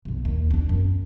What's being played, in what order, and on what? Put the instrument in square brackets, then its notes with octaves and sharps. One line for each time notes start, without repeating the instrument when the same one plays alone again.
[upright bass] B1 G2
D#2
C4 D4
F#2